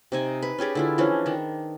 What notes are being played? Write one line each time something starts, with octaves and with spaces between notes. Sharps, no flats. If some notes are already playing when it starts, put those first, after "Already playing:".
C3 D#4 G#5
B4
C#4 G4 G#4 D5
D3 E4 F4
E3 F3 C#4 D4
D#3 D4